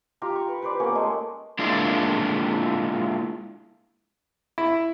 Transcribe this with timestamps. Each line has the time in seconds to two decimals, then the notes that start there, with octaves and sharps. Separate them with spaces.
0.22 F4 G4 G5 A#5
0.35 C#6
0.48 B4
0.62 B4 C5 D5
0.80 A#3 B3 C#4 A#4
0.95 G#3 A3
1.59 G#3 A#3 D4 E4 F4
4.58 E4